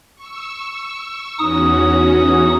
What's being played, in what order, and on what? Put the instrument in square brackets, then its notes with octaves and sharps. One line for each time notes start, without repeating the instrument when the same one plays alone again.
[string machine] C#6 E6
[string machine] E2 C#4 F#4 [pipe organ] D#4 D#6